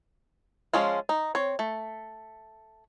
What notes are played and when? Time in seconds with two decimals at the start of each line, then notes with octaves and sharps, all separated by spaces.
0.73 F3 G#3 C#4 F4
1.09 D#4
1.35 C4 C#5
1.59 A3